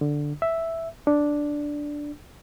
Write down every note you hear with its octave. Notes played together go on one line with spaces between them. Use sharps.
D3
E5
D4